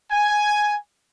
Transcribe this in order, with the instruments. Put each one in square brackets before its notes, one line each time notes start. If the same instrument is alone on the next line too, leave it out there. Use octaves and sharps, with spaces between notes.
[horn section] G#5